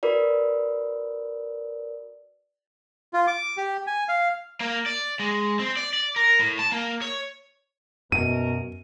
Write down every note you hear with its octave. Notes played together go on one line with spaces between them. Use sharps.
F#4 A#4 B4 D5
F4
D6
G4
G#5
F5
A#3
D5
G#3
C4
D5
D5
A#4
A2
A5
A#3
C#5
F#2 B2 A#4 D#7